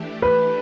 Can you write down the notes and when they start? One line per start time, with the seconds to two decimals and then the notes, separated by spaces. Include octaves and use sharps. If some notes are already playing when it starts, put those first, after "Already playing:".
Already playing: E3 A3 D4 G4
0.22 B4